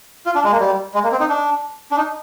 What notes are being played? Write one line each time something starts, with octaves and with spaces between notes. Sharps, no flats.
F4
D4
G#3
A#3
G3
G#3
A#3
C4
D#4
D4
D4
D#4